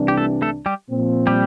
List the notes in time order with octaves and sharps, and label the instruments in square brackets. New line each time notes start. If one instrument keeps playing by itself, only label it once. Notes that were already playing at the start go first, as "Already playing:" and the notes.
Already playing: [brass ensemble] C2 C3 E3 G3 D4
[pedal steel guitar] G4
A3 A4
A3 A4
G3 G4
[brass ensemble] A#2 F3 C4
[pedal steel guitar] G3 G4